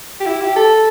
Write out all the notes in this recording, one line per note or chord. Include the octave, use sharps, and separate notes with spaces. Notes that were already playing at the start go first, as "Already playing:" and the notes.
G4
E4
G4
A4